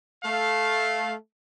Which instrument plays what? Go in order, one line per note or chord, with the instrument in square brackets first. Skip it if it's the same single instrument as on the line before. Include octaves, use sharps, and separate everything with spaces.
[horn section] A3 F5